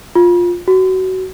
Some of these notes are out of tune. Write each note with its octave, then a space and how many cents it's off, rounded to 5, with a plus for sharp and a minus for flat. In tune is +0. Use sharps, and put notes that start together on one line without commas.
F4 +10
F#4 +20